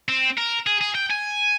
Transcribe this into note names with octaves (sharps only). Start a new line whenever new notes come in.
C4
A#4
G#4
G#4
G5
G#5